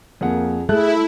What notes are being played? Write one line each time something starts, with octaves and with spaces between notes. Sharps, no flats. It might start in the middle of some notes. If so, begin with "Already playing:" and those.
F2 A#3 G#4 F#5
A3 E4 G#4 F#6